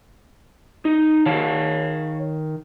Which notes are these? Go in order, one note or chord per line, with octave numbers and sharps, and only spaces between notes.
D#4
D#3 C#5 F5 A5